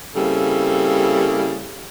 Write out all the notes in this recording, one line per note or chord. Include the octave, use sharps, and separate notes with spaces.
C#3 G3 A#3 C4 E4 A4